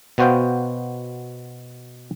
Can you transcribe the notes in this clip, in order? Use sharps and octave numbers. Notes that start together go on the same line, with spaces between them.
B2 B3 F#4 C5 F5 G5